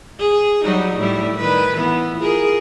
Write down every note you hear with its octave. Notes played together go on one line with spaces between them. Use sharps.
G#4
F#3 G3 D#4
A2 G3 E4
D#3 B4
E3 B3
F4 G#4 A#4